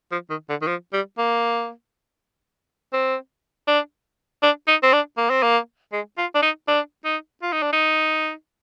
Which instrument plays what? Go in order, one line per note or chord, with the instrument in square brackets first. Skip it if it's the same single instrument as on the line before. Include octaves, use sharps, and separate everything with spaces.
[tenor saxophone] F3
D#3
D3
D#3
F3
G3
A#3
C4
D4
D4
D#4
C4
D4
A#3
C4
A#3
G#3
F4
D4
D#4
D4
D#4
F4
D#4
D4
D#4